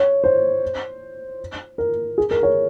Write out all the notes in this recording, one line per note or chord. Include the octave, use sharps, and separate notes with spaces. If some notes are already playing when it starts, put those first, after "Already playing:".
Already playing: C#5
C5
A#4
G#4
A#4
C#5